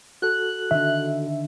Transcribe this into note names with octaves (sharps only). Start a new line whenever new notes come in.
F#4 A4 F#6
D3 D#3 E5